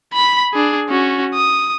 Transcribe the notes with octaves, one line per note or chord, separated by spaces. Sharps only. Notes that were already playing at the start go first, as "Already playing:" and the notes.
B5 B6
D4 G#4
C#4 F#4
D#6